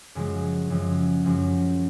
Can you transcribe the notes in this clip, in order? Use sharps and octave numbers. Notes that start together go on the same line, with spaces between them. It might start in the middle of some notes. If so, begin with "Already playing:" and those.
F#2 C#3 F3 G#3
F#2 C#3 F3 G#3
F#2 C#3 F3 G#3